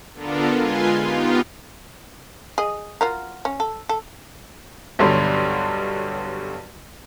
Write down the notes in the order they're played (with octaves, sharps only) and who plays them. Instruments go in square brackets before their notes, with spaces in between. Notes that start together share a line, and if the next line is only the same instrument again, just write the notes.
[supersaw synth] D3 B3 D4 F4 A4 A#4
G#3 F4 B4 G#5 C6
B3 D#4 F4 G4
[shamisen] G#4 D#5
F4 F#4 A#4
C#4
A4
A4
[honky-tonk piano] B1 G2 D3 F#3 G3